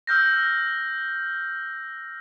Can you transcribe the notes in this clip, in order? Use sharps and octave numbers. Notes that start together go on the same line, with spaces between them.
E6 F6 G6 A#6